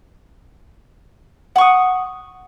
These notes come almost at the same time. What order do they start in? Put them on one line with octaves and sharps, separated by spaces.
F#5 C#6 D#6